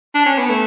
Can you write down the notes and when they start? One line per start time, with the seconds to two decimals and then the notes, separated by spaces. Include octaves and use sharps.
0.15 D4
0.26 C#4
0.38 B3
0.50 A3